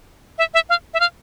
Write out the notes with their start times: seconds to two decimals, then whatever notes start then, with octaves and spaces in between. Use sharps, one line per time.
0.38 E5
0.54 E5
0.69 F5
0.94 E5
1.00 F5